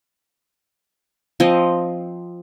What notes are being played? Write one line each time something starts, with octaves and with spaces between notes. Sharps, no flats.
F3 C4 D#5